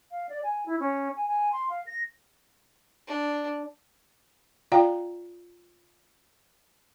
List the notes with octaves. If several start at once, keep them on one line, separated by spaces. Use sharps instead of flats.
F5
D5
G#5
E4
C#4
G#5
G#5
C6
F5
A#6
D4
F4 D5 F5 G5 A#5